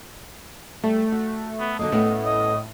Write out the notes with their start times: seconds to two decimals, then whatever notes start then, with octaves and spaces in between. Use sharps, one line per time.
0.84 G3 A3
1.12 F#4
1.60 B3
1.79 D3 F#3 A#3 D#5
1.92 A2 A3 B3 C#4
2.25 D#5